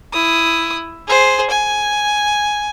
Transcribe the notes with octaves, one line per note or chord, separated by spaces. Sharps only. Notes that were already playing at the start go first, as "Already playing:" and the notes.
E4 D#6
G#4 C5
G#5